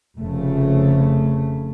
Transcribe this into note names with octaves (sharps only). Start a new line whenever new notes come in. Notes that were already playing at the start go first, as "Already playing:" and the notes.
F1 C#3 A3